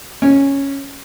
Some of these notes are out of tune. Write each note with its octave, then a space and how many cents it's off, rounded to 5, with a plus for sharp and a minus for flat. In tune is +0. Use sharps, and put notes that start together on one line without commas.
C#4 -5